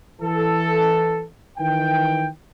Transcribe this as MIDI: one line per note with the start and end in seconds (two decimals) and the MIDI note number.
0.22 1.25 52
0.22 1.25 69
1.59 2.27 51
1.59 2.27 52
1.59 2.27 79